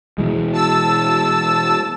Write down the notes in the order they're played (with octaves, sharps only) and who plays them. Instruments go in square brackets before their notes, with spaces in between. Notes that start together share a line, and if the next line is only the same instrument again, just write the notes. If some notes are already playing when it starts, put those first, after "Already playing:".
[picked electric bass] B2 E3 G#3
[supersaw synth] A5 E6